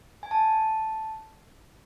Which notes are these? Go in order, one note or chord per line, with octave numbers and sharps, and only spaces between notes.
G#5
A5